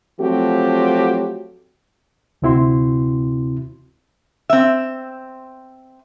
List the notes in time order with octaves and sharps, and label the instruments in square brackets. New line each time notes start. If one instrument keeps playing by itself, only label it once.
[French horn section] F3 F#3 A3 C4 F#4 G4
[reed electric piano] D2 C3 C4 E4 F#4 C6
[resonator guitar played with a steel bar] C4 E5